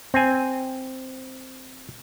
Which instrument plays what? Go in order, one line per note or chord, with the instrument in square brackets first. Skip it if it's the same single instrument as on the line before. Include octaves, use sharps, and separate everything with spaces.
[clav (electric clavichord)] C4 G#5